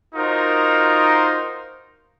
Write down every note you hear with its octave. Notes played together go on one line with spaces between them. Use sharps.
D#4 F4 F#4 A#4 C5